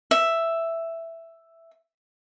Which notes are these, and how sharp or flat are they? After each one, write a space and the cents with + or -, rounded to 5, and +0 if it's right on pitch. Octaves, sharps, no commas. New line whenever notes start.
E5 +5